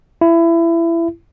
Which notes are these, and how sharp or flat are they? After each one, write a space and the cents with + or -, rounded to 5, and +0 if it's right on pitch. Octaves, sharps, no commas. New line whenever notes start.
E4 +25